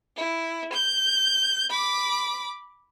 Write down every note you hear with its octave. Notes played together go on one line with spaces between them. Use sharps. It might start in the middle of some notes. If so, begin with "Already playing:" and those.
E4
G6
B5 D6